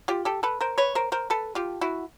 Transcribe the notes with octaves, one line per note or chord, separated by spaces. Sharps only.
F4 G4
G4 A4
A4 B4
A#4 C5
B4 C#5
A#4 C5
A#4 C5
A4 B4
F4 G4
E4 F#4